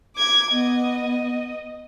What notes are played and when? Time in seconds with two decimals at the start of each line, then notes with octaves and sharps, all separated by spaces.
0.16 D6 G#6
0.51 B3 D#5